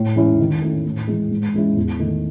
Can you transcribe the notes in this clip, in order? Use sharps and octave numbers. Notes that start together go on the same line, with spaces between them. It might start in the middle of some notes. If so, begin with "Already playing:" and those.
Already playing: A2
E3 G#3 C#4 E4
D#3
A3 C#4 E4
A2
E3 G#3
G#2
E3 G#3 C#4 E4
E2
D#3 A3 D#4